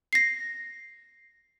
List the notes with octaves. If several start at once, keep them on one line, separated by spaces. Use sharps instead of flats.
A#6 C7